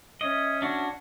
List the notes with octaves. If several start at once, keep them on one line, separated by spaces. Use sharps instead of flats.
C#4 D#5 E5 G#6
D4 F#4